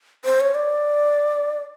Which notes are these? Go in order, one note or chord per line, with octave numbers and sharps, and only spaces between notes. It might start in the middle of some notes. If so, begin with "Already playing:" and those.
C5
C#5
D5